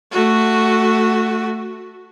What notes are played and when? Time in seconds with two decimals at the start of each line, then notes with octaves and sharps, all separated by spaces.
0.12 A3 F#4